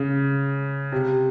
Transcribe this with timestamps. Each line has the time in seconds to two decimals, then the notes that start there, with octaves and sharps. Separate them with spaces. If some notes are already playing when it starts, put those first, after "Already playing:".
Already playing: C#3
0.92 C3